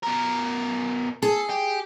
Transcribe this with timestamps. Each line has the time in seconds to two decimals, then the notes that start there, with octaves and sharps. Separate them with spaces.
0.03 B2 A#4
1.22 G#4 A4
1.49 G4